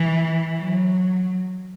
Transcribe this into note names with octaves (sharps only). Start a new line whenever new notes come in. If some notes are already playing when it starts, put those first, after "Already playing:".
Already playing: E3
F#3